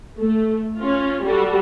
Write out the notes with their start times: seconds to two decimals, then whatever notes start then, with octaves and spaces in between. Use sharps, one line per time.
0.18 A3
0.77 C#4 F4
1.24 G3 F#4 A4